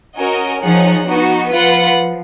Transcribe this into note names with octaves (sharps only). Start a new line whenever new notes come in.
C#4 F#4 A#4 D#5 G#5
F3 D#4 G#4 C#5 F#5
B3 D#4 F#4
F3 F4 B4 F#5